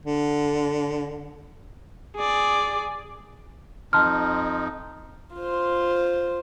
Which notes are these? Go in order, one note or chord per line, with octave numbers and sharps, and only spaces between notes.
D3
G#4 D5
F2 D#4 A5 C6 F6
F4 C5